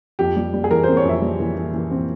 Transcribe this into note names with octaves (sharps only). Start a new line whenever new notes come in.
F2 G4
G3
G3
G#4
E3 A#4
C4 C5
C#5
F2 E5
G3
E3
E3
E3
C4